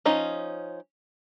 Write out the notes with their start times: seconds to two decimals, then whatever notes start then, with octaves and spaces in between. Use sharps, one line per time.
0.05 F3 C#4 D#4